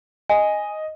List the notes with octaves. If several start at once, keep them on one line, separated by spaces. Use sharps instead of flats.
D#5 G#5